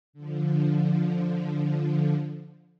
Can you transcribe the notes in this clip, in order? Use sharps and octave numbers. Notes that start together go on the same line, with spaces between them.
D3 F3